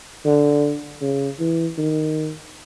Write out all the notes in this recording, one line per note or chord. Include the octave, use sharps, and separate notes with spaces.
D3
C#3
E3
D#3